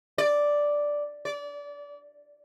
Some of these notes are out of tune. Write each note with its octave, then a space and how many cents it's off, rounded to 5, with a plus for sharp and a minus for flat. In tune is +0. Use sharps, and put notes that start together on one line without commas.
D5 +0
D5 -25